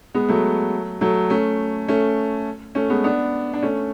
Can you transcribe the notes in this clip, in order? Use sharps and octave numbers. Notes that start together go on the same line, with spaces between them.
G#3 B3
F#3 A3
F#3 A3
A3 C#4
A3 C#4
A3 C#4
G#3 B3
B3 D4
D4
A3 C#4